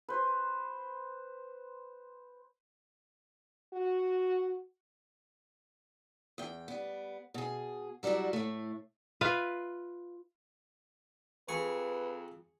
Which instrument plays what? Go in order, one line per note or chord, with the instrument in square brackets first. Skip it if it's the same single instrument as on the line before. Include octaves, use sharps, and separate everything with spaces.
[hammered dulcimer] B4 C5
[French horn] F#4
[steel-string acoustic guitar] E2 G5
G3 B3
B2 G#4
F#3 G3 D4 E4 F#4
A2 A3
[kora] F4 B4 E5 F5
[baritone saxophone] F2 [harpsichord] G#4 C#6 [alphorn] B4